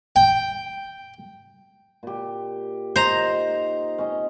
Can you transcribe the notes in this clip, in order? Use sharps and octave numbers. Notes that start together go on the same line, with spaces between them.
G5
A#2 G4
D#4 C5 A#5
C#4 D#5